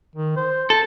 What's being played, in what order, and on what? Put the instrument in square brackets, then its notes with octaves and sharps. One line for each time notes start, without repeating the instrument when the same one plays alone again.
[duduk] D#3
C5
[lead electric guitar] A4